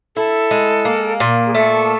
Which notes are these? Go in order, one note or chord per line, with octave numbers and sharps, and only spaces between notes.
E4 A4
G#3
A#3
A#2
G#4
A3 A4